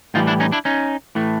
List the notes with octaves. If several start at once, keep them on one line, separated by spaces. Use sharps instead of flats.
A2 E3 G3 D#4 F4
D4 E4
C#4 D#4
D4 E4
C#4 D#4
A2 E3 A3